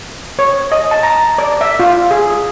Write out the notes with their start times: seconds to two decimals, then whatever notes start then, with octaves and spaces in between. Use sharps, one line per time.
0.39 C#5
0.72 D#5
0.91 A5
1.03 A#5
1.38 D5
1.61 E5
1.80 F4
2.11 G#4